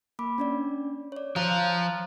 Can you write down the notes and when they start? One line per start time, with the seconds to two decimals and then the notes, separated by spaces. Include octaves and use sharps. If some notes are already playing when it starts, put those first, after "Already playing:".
0.19 A#3 B5 D6
0.38 C#4 D4 D5
1.12 C#5 D5
1.36 F3 F4 F5 A#5 F#6